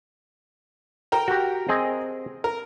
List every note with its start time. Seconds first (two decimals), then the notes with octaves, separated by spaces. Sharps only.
1.12 A#4 G5 A#5
1.28 F#4 G4
1.69 C4 G#4 D#5
2.44 A#4